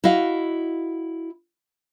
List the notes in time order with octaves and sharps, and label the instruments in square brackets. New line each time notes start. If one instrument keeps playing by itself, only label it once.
[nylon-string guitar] E4 F#4 D#5 F5